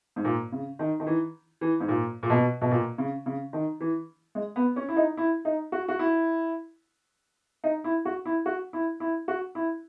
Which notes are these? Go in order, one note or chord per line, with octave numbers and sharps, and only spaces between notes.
G#2
A#2
C#3
D#3
D#3
E3
E3
G#2
A#2
A#2
B2
B2
A#2
C#3
C#3
D#3
E3
G#3
B3
C#4
E4
D#4
E4
D#4
F#4
F#4
E4
D#4
E4
F#4
E4
F#4
E4
E4
F#4
E4